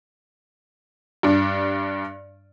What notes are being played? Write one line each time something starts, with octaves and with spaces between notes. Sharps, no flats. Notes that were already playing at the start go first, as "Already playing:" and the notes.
G2 D4